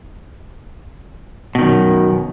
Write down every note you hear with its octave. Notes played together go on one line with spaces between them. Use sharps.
F#2 B2 D#3